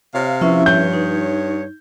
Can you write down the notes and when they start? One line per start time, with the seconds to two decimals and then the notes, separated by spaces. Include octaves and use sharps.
0.15 C3 C#5 F5
0.41 F3 C#4 E4 B4 E5
0.66 G2 C#5 G6
0.93 D#4